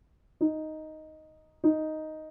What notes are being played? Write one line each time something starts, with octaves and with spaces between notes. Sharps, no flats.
D#4
D#4